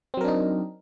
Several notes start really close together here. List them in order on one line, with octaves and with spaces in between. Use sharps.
C4 F#3 A#4 D4 D#4